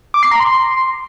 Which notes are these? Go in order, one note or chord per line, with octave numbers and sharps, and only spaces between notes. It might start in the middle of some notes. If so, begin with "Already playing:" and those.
D6
C7
A#5
C6